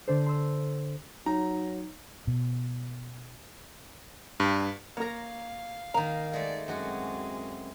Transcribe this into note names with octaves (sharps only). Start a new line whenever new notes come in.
D3 D4 A4 C5
C6 E6
F#3 D#4 A#5
B2
G2
A#3 A#4 C#5 F5 A#5
D#3 A#3 A#5
G#3 A3 D5
F#2 G#3 C4 F#4